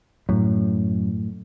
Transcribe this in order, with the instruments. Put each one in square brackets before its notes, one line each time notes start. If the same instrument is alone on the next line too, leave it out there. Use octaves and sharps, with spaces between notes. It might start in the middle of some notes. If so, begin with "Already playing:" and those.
[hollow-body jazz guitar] F#2 [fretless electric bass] A2